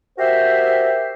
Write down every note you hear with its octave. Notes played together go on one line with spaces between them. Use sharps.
F#4 G4 A#4 C5 E5